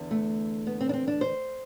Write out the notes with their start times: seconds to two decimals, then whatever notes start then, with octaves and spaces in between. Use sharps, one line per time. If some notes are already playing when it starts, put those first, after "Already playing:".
Already playing: E2 D3
0.11 A3
0.67 B3
0.80 C4
0.89 D4
0.93 C4
1.07 D4
1.21 C5